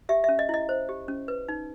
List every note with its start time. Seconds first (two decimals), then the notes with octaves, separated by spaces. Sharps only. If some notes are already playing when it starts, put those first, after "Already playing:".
0.09 G4 E5
0.24 E5
0.29 C#4
0.39 D#5
0.49 E4 D#5
0.69 C5
0.89 G4
1.08 C#4
1.28 B4
1.49 D#4